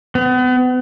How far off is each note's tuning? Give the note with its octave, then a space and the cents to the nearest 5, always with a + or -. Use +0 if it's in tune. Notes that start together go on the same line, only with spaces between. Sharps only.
B3 +35